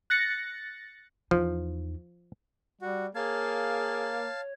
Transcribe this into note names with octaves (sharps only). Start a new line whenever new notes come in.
F#6 A6 A#6 C#7
E2 F3 D#4
G3 F#4
A#3 G#4 C#5 F5 A5